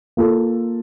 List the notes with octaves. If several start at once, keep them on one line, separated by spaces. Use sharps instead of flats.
A#3 F4 A4